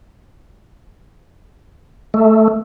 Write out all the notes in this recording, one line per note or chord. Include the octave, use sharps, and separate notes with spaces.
A3